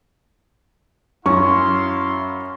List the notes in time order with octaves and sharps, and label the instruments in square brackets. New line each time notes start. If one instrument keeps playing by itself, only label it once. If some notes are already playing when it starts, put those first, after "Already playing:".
[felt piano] F#2 C#4 [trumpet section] E4 F5 C6 [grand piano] C#6